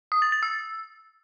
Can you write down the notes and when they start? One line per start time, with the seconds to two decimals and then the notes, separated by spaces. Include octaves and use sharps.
0.12 D#6
0.22 A6
0.32 A6
0.43 E6